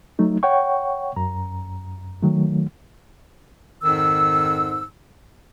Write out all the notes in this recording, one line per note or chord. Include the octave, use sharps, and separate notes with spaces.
F#3 A3 D#4
C#5 F#5 G5 C#6
F#2 A#5
D#3 F#3 A3
F2 G#2 D#3 E6